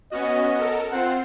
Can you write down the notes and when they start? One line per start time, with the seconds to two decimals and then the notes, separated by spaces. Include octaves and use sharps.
0.11 B3 C#4 F#4 D#5
0.58 A4 A#4
0.91 C4 F4 C5 F#5